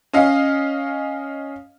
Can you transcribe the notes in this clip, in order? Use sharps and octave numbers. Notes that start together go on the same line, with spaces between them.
C#4 D#5 F5